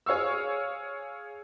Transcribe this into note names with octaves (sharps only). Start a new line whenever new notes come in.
G#4 C#5 F5 C#6 E6